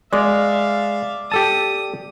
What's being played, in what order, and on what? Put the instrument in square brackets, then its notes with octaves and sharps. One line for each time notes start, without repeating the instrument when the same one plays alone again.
[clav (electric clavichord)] G#3 [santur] D5 [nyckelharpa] E5 F5
[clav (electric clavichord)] G4 A4 A5 [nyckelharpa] D#6